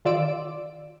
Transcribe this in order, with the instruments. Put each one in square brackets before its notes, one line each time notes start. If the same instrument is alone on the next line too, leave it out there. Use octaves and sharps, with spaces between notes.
[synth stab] D#3 F4 D5 E6 D7